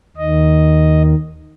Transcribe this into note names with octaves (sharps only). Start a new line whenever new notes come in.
D#2 D#3 D#5